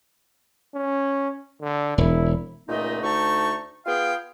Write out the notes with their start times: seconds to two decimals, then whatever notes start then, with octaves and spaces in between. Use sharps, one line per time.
0.75 C#4
1.61 D3
1.98 E1 E4
2.69 C#2 A#2 A3 D#4 D#5
3.02 D2 D3 A3 D#4 A5 C#6
3.86 B3 F4 G#4 F5 G5